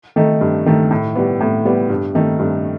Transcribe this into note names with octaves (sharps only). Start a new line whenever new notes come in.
D#3 A3 D#4
G2
D#3 A3 D#4
A2
G3 B3
A2
G3 B3
G2
D#3 A3 D#4
G2